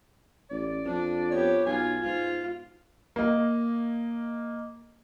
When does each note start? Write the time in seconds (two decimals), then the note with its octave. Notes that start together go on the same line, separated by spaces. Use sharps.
0.50 A1 D5
0.85 F2 D4
1.32 B3 G4 C#5
1.67 B1 F4 G#5
2.03 G#2 F4
3.16 A#3 D#5